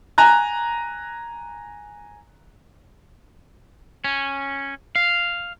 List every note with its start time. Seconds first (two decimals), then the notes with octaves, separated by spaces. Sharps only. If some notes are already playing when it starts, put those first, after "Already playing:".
0.18 G#5 A#5 F#6
4.04 C#4
4.96 F5